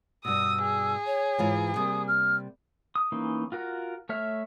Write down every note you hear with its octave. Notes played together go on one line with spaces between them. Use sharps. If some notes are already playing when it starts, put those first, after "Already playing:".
G2 B2 D#6 E6
G#4
C#5
G#2 E3 F4
C3 G3 A#3 D#6
F6
D#6
E3 A#3 C#4 D#4
F4 F#4 A#4
A3 C#5 E5 F6